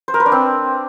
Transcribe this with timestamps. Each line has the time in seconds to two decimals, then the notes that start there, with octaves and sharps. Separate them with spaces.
0.08 C5
0.14 A#4
0.20 B4
0.26 D4
0.32 C4